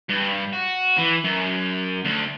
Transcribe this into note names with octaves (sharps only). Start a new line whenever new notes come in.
G2
F#4
E3
F#2
D2